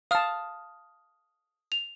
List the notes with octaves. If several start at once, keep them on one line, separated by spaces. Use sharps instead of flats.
F5 A5 D#6 F6
F7